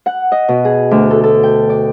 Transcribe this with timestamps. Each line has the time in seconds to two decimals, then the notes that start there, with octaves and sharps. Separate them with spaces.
0.06 F#5
0.32 D#5
0.49 B2
0.65 G#4
0.91 D2
1.11 A4
1.23 A4
1.43 G5
1.70 D5